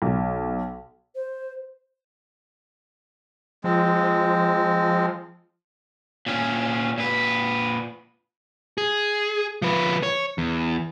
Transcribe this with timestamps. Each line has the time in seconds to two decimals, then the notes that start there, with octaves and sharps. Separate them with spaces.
0.02 B1
1.15 C5
3.64 F3 G#3 C4
6.26 A#2 C#4
6.98 A#2 B4
8.78 G#4
9.62 F3 B4
10.03 C#5
10.38 E2